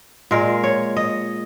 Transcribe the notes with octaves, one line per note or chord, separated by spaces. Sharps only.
A#2 G#3 A#4
C#5
D#5